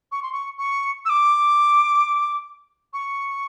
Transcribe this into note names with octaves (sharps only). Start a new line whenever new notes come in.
C#6
C6
C#6
C#6
E6
D6
C#6